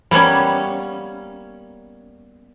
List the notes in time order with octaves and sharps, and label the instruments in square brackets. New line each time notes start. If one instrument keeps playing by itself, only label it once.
[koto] G3 A#3 B3 C#4